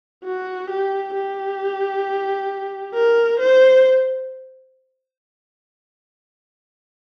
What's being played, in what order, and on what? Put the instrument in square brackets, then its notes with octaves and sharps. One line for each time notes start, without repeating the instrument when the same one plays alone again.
[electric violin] F#4
G4
G4
A#4
C5